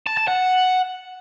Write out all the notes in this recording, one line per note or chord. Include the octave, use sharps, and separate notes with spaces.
A5
A5
F#5